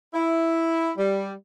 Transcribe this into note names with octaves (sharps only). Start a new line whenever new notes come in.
E4
G3